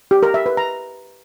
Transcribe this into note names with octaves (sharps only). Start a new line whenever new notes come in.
G4
A#4
E5
B4
A#5